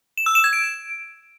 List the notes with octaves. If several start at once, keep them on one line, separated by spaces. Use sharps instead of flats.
E7
E6
E7
G#6
D7